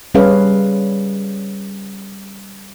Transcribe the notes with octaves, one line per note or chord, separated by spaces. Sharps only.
G3 C#4 G#4 B4 C#5 F5